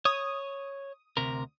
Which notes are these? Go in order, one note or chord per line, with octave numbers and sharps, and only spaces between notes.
C#5 D#6
D2 C3 A#4